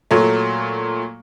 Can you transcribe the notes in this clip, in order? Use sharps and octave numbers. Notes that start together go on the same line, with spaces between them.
A#2 F#3 A3